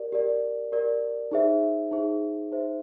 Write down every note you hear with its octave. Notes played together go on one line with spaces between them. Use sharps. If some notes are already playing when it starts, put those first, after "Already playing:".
Already playing: G4 A#4 D5
G4 A#4 D5
G4 A#4 D5
D#4 G#4 C5 E5
D#4 G#4 C5 E5
D#4 G#4 C5 E5